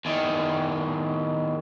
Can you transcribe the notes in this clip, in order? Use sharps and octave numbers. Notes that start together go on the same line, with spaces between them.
E2 D#3